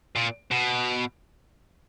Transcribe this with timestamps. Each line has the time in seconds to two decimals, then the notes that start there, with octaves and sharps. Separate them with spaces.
0.16 A#2
0.51 B2